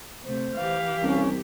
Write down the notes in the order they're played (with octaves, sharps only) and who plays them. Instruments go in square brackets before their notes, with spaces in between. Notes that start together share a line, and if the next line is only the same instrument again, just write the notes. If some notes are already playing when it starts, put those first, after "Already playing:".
[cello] C3 A3 [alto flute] C5
[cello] E3 G4 [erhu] F5
[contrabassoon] C2 [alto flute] C#4